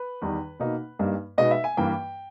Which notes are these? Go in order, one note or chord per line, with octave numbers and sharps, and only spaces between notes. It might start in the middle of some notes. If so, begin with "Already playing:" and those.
Already playing: B4
E2 D#3 G3
B2 A#3 D#4
G2 G3 A#3 D#4
B2 G#3 B3 D#4 D#5
E5
G#5
G2 E3 A#3 G5